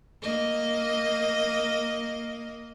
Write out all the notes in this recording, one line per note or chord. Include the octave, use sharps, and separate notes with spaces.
A#3 D#5